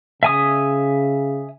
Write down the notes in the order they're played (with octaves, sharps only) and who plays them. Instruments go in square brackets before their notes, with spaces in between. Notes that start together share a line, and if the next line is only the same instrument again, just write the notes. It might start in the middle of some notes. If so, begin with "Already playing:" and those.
[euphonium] C#3 [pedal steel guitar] E5 G#5 D#6